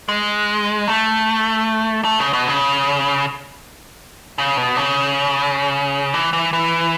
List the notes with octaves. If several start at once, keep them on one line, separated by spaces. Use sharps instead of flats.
G#3
A3
A3
C#3
B2
C#3
C#3
B2
C#3
E3
E3
E3